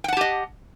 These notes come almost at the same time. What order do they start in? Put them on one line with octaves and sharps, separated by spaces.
G5 F#5 A5 G4 D#5